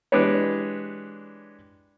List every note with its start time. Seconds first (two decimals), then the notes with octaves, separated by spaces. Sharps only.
0.12 E3 G#3 D4 G4 B4 C#5